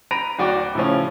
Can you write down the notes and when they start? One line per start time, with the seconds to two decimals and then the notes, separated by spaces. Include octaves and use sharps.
0.11 A#5 B5 A#6 D7 D#7 F7
0.39 D1 F#4 D5 G5 D6
0.75 A2 C#3 F3 C#4